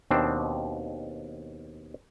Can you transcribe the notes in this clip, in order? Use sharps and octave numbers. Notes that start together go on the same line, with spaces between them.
D#2 B2 C4 D4